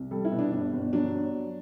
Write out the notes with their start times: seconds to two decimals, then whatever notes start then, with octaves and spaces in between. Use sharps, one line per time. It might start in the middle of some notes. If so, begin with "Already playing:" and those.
Already playing: C2
0.11 G3 A4
0.25 E4
0.32 B2
0.39 D4
0.52 G1 D4
0.73 G1
0.93 F#3 D4